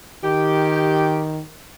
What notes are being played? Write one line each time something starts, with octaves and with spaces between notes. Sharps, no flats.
D#3 G4